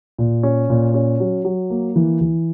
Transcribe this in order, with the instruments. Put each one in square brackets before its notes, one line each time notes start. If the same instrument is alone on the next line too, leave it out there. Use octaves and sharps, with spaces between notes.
[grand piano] A#2
C#4
A#2
C#4
F#3
F#3
A#3
E3
E3